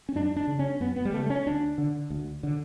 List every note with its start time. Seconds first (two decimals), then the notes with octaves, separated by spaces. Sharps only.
0.09 C#4
0.15 F#2 D4
0.36 D4
0.47 C#3
0.59 C#4
0.80 F#2 B3
0.96 B3
1.05 G3
1.13 C#3 A3
1.30 C#4
1.46 D2 D4
1.78 D3
2.10 D2
2.43 D3